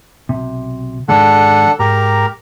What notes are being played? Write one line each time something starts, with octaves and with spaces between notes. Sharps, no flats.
B1 C3
G#2 D#3 G#3 D4 A4 F#5
G#2 G4 A#4 A#5